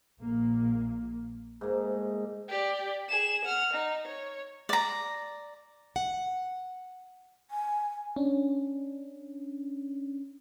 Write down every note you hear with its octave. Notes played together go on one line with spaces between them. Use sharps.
A#1 A#2 A#3
G#2 A3 A#3
G4 D5
G#4 E7
F#5 F6
D#4
C#5
D5 A#5
F#5
G#5
C#4 D4